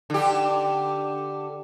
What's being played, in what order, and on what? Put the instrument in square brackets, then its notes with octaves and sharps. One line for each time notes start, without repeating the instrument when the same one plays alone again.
[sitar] D3 G4